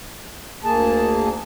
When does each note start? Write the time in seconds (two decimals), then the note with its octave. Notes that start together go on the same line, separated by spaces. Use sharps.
0.64 D2 A#3 G#4 A5